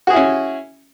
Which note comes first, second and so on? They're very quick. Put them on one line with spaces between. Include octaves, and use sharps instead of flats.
F#4 G#4 E4 C#4